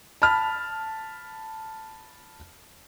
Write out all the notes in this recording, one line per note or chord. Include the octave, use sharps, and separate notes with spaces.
A5 B5 F6